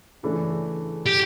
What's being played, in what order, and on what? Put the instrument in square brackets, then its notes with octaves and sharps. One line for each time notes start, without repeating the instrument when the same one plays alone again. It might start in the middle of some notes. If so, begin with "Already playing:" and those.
[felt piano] C#3 E3 A3 D4
[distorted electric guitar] G4